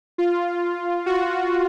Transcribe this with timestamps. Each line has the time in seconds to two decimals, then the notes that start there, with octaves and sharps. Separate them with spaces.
0.18 F4
1.06 F#4